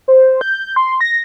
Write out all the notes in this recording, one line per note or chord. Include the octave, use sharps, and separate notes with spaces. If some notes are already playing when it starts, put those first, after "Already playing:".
C5
G6
C6
A#6